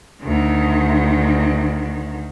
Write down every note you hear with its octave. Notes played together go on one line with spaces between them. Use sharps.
D2 D#3